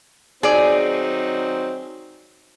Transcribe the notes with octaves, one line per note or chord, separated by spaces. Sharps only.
F#3 C4 D#4 G#4 D5